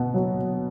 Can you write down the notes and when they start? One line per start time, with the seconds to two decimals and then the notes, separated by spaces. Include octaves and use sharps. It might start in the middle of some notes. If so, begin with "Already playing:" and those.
Already playing: B2 B3
0.14 F#3